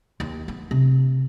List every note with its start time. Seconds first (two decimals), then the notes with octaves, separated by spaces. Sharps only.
0.20 D#2
0.48 B3
0.71 C3